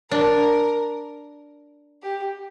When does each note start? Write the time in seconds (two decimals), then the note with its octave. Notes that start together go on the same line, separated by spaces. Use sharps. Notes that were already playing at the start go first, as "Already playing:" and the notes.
0.11 D4 A#4
2.03 G4